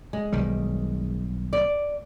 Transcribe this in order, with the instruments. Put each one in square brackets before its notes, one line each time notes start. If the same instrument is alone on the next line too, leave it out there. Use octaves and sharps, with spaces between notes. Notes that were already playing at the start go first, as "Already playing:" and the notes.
[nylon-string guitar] G#3
[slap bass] B1 D#3 G3
[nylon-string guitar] D5